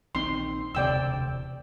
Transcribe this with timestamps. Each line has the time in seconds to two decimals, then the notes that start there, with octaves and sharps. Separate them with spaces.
0.15 A#1 D#3 C4 C6
0.75 E1 D2 C3 D5 G5 E6